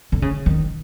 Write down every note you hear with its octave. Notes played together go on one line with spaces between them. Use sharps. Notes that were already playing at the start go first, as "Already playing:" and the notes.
D3
C#3
D#3